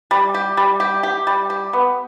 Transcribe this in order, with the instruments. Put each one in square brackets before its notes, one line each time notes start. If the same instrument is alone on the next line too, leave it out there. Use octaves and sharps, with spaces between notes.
[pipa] G3
G4
G3
G4
G4
G3
G4
B3